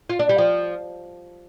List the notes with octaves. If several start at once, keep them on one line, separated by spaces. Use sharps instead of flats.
F4
D4
G3
F3